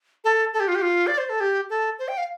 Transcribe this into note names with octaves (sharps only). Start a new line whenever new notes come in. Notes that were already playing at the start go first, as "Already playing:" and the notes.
A4
A4
G4
F4
G4
F4
D5
C5
A4
G4
A4
C5
G5
F5